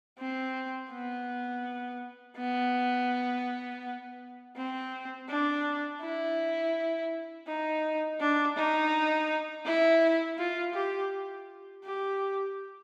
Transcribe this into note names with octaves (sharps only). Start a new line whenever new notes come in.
C4
B3
B3
C4
D4
E4
D#4
D4
D#4
E4
F4
G4
G4